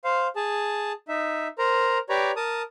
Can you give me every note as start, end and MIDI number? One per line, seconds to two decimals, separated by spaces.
0.05 0.27 72
0.05 0.27 77
0.36 0.92 68
0.36 0.92 81
1.08 1.48 63
1.08 1.48 76
1.58 1.98 70
1.58 1.98 72
1.58 1.98 82
2.09 2.31 67
2.09 2.31 71
2.09 2.31 73
2.09 2.31 74
2.09 2.31 82
2.36 2.62 70
2.36 2.62 81
2.36 2.62 87